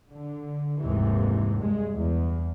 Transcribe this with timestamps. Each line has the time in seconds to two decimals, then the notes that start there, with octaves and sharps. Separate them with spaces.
0.10 D3
0.82 F1 D#2 G#2 C3 E3
1.61 G2 G#3
1.95 E2